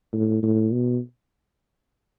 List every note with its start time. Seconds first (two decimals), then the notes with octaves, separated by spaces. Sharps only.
0.13 A2
0.43 A2
0.73 B2